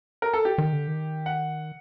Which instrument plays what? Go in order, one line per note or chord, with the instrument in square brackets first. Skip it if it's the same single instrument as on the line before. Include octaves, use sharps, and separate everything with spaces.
[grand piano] A#4
A4
G4
[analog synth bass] D#3
D3
D#3
[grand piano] F#5